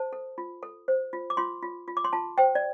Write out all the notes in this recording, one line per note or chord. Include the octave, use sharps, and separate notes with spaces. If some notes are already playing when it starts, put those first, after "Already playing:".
Already playing: C5 A5
A4
F4
A4
C5
F4
D6
F4 C6
F4
F4
D6
C6
F4 A5
C5 G5
D5